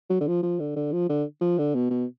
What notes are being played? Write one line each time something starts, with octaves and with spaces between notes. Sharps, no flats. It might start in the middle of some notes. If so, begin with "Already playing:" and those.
F#3
D3
F3
F3
D3
D3
F3
D3
F3
D3
B2
B2